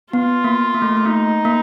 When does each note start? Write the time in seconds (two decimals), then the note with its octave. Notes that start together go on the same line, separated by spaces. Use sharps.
0.13 B3 F4
0.44 A#3
0.74 A#3
0.82 A3
0.97 A3
1.05 A#3 D#4
1.45 A#3